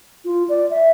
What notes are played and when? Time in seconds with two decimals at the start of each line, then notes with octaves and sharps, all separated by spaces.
0.25 F4
0.49 D5
0.71 E5